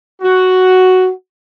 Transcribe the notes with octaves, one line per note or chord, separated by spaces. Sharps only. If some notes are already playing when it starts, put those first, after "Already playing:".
F#4